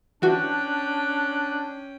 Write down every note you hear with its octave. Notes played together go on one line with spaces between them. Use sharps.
E3 C#4 D4 F#4 G5 F#6